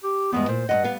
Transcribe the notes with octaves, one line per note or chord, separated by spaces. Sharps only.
G4
E2 G2 G#3 B3
A#2 C5
G2 C3 D#5 F#5
G3 B3 F5